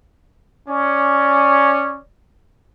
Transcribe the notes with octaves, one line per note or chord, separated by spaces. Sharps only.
C#4 D5